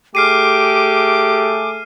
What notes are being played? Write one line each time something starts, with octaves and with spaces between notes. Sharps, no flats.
A3 G4 G#4 D6 F6 C7 D#7